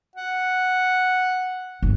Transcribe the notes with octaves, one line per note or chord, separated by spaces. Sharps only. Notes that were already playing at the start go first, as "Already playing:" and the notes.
F#5
G1